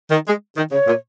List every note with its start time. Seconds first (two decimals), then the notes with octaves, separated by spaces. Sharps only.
0.11 D#3
0.27 G#3
0.57 D#3
0.72 C#3 C#5
0.87 A#2